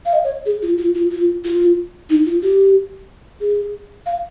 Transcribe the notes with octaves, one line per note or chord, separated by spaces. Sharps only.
F5
D#5
C#5
G#4
F4
F4
F4
F4
F4
D#4
F4
G4
G#4
F5